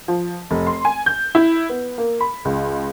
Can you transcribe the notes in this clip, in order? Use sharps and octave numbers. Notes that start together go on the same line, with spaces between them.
F3
F1
C6
G#5
G6
E4
B3
A#3
B5
C#2